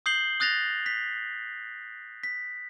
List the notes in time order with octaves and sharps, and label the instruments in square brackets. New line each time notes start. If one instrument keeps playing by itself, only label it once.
[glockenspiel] D#6 G6 C7 F#7 G7
D#6 F#6 A6 A#6 F7
B6
B6